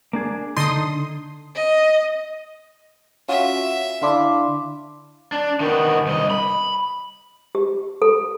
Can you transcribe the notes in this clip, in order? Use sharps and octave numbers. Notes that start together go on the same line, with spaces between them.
A#3 D4 G#4
D3 D#4 A4 D#5 C6 D#6
D#5
C#4 F4 F#4 E5
D3 D4 E4 F5 C6 D6
D4
D#3 B3
C2 D#5
B5
G4
A4